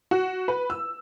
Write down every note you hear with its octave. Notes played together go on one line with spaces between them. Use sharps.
F#4
B4
E6